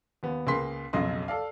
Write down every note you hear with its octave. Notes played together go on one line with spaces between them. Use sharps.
D#2 B3
C#2 A#3 G#4 B4 C6 B6
B1 F2 C#3 F#3 D#5 C6
A4 D5 F5